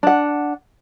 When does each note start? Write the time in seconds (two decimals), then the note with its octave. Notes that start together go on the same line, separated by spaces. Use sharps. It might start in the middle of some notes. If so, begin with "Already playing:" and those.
0.03 D4 F#5